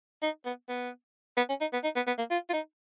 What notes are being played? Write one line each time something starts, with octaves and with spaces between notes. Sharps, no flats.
D#4
B3
B3
B3
C#4
D#4
B3
D#4
B3
B3
A#3
F4
F4
D#4